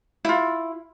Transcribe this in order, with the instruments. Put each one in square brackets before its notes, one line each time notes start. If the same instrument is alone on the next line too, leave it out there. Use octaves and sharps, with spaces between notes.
[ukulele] E4 F4